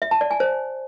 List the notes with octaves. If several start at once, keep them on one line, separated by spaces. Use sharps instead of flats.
E5
A5
D5
G#5
C5